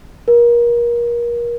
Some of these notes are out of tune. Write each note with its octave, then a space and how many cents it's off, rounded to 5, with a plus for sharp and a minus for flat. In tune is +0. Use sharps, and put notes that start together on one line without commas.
A#4 +30